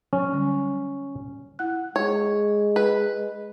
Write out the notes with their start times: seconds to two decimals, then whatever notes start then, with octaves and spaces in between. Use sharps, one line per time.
0.13 F#3 C#4
0.33 D3 G3
1.59 E4 F#5 F#6
1.96 G#3 C#5
2.76 B4